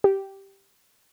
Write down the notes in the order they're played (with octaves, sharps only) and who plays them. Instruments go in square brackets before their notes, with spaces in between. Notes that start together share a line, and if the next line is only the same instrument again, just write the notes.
[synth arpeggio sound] G4